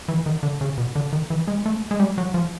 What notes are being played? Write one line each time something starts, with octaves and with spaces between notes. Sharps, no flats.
E3
D#3
D3
C#3
B2
D3
D#3
E3
G#3
A3
G#3
G3
F#3
F3